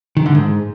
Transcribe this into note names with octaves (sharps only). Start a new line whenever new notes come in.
D#3
D3
G#2